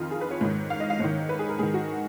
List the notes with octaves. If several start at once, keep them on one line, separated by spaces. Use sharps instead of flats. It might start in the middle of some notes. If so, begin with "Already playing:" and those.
Already playing: F2 D#3 F4
G#4
B4
C#5
G#2 D#3
F5
D#5
F5
G#2 D#3 C#5
B4
G#4
A#4
G#2 D#3 G#4
F#4